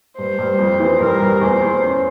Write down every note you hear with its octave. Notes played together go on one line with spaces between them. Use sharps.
G2 C5
G2
F2
E3
G2 A#4
G2
E2 C5
E2
C#4